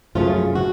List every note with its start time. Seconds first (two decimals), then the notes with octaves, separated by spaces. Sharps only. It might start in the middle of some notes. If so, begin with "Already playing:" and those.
0.15 F#2 C#3 F3 A3 C#4 F4
0.55 F#4